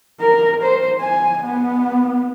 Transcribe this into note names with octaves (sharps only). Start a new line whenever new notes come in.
A#4
C5
G#5
B3